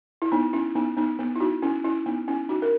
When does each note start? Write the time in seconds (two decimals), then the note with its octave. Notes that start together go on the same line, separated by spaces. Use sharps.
0.22 E4
0.32 B3 D#4
0.53 C#4 E4
0.75 B3 D#4
0.97 B3 D#4
1.19 B3
1.36 E4
1.40 D#4 F#4
1.62 C#4 E4
1.84 C#4 E4
2.06 B3 D#4
2.28 C#4 E4
2.49 D#4 F#4
2.62 A#4